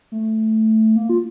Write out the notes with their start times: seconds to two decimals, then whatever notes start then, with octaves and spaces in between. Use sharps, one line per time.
0.12 A3
0.96 A#3
1.09 F4